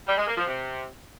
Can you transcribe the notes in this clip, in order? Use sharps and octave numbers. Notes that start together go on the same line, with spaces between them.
G3
G#3
A#3
F3
C3